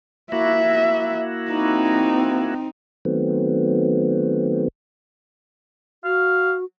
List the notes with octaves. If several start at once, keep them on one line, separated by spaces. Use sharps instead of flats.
A#3 E4 F#4 E5
C4 D#4
D#3 F#3 A3 B3 C4
F#4 F5